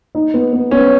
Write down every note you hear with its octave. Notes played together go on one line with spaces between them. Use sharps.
D#4
B3
B3
B3 C#4